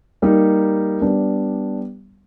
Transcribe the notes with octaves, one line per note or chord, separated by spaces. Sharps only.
G3 A#3 D#4 G4
G3 B3 D4